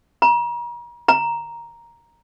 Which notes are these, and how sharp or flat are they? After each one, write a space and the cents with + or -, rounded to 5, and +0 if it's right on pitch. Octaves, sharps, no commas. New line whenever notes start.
A#5 +40
A#5 +5